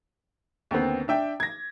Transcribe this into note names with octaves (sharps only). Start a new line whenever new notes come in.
D#2 D3 B3 C4
D4 E5 G5
G#6 A#6